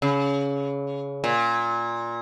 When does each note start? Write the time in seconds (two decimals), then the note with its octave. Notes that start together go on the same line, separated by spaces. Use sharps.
0.02 C#3
1.24 A#2